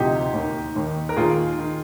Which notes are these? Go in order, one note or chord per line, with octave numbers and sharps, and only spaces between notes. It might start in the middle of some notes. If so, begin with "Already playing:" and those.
Already playing: D2 C3 F3 D#4 G4
D#2 D#3
D#2 D#3
A#4
D#2 D#3 F4 G#4
D#3